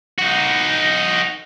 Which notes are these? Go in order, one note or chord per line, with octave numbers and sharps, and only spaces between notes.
D#4 F#4